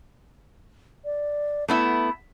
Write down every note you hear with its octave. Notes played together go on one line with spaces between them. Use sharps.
D5
A3 B3 E4 B5